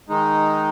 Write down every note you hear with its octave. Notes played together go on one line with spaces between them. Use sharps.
D#3 G#3 D#4